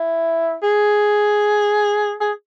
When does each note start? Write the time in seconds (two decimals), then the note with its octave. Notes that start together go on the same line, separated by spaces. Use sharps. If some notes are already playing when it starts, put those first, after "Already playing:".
Already playing: E4
0.63 G#4
2.21 G#4